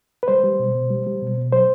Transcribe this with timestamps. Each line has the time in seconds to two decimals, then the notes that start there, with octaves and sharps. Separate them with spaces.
0.23 B4
0.28 G3 C5
0.44 G3
0.60 B2
0.75 B2
0.90 G3
1.07 G3
1.22 B2
1.38 B2
1.53 F#3 C5